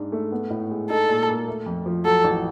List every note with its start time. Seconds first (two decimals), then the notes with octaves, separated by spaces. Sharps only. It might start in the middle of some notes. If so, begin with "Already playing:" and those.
Already playing: G#2 D4
0.12 A3
0.32 B3
0.50 A2
0.69 G#3
0.90 D#4 A4
1.09 A#2
1.28 A#3
1.48 A3
1.66 F2
1.86 F3
2.05 F#3 A4
2.24 A1